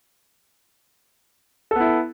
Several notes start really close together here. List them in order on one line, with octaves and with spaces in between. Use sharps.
A4 B3 E4